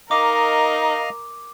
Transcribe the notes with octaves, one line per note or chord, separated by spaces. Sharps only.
D#4 A#4 D#5 F5 D6